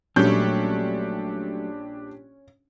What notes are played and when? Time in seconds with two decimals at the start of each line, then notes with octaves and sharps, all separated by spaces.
0.16 A#1 F#3 G3 A3 C#4 D4 G4 G6